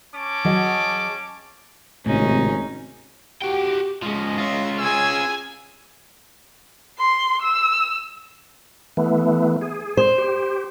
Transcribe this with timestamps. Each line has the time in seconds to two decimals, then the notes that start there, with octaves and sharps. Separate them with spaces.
0.14 C#4 A5 D6
0.45 F#3 G#4 D#5
2.06 G#1 A2 C3 C#4 D#4
3.42 F#4 G4 G5
4.02 F3 G#3 C#4 D#5
4.38 C#4 F4 E5
4.79 G#4 G#5 E6
6.98 C6
7.42 E6
8.97 E3 A3 B3
9.61 G#4
9.97 C5
10.18 G4